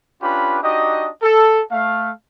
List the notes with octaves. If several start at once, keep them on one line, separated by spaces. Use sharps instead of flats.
C#4 D4 F4 G4 B4 B5
D4 D#4 F#4 G4 D#5
A4
A3 F5